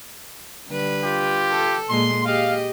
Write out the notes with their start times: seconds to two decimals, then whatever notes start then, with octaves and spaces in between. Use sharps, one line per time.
0.69 D3 G3 B4
1.04 F4 G4
1.50 A4
1.90 A#2 G#3 C6
2.25 G4 G#4 D#5 F5